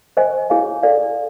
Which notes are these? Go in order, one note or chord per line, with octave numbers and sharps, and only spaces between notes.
C5 D#5 G#5
E4 G#4 C#5 F5 G#5
A4 D5 F5 G#5